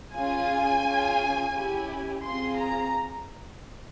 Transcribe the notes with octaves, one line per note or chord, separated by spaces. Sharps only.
C#4 F4 G#4 G#5
C#4 F4 G#4
C#4 E4 G4
C4 F4 G#4 C6
A#5